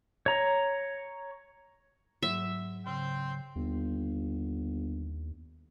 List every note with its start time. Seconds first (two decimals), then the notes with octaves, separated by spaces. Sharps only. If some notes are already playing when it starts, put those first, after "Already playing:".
0.26 C#5 A#5
2.23 G#2 F#3 E5 E6
2.87 C#3 G5 C6
3.56 G1 D#2